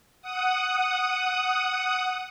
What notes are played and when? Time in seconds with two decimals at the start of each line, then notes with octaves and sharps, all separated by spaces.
0.22 F#5 D#6